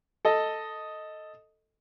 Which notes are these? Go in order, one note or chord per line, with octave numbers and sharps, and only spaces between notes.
A4 D#5